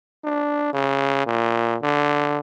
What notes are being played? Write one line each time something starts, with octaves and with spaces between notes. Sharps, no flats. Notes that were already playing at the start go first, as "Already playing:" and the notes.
D4
C#3
A#2
D3